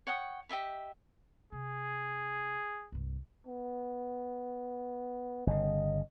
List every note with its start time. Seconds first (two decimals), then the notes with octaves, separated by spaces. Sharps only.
0.07 C#5 F#5 G5 D#6
0.49 G4 D#5 E5 B5
1.52 C3 G#4
2.92 C2 G2
3.47 B3
5.47 G1 C#3 D#5